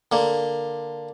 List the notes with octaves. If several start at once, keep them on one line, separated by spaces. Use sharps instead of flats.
D3 A#3